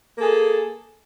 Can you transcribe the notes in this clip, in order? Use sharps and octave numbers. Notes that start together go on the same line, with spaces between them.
A#3 G#4 A4